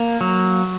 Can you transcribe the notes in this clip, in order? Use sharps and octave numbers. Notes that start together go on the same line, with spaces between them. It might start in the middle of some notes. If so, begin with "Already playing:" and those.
Already playing: A#3
F#3